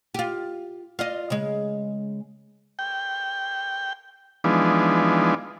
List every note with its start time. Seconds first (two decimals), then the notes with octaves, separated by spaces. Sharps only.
0.14 F4 G4
0.99 F4 D5 D#5
1.30 C#3 G#3
2.79 G5
4.44 E3 F3 G#3 B3 D4 D#4